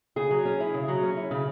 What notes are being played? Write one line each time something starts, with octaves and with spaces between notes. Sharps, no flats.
C#3 G#4
F#3
C#4
E4
C#3
F#3
C#4
E4
C#3